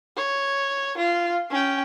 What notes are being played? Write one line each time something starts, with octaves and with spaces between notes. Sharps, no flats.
C#5
F4
C#4 G5